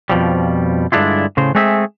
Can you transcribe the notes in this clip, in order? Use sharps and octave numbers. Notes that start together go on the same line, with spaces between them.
F2 B2 F3 G3
G2 D3 G#3 D4 E4 F4
A2 C#3 C5
G#3 A3 C4 G#4 E5